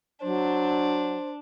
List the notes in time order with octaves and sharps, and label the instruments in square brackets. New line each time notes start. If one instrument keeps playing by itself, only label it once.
[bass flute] F#3 [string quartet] D4 [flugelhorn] C5